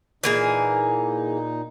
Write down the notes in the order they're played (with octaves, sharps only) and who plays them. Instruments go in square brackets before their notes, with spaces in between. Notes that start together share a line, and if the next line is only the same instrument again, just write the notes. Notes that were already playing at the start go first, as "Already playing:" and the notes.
[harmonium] A#2 D#4 [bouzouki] E3 A#3 G#4